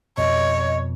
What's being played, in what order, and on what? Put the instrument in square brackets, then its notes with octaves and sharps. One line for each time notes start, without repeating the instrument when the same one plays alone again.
[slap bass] F2 B2 [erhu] C#5 [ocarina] D#5